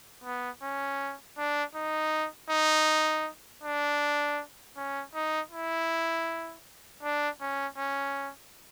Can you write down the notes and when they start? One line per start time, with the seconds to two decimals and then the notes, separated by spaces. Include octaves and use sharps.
0.24 B3
0.62 C#4
1.38 D4
1.75 D#4
2.50 D#4
3.64 D4
4.77 C#4
5.14 D#4
5.52 E4
7.03 D4
7.41 C#4
7.78 C#4